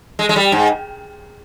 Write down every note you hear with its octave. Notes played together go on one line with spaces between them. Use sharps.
G#3
G#3
G3
G#2